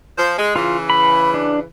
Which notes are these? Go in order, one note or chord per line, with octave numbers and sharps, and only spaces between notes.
F3 C5
G#3
C#3 E3 F4
B5
D4